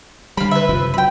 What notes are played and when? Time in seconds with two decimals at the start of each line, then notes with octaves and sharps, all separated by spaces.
0.37 D3 G3 F5 B5
0.51 B4 E5
0.69 F#1 C3 F3
0.94 F#3 G5 B5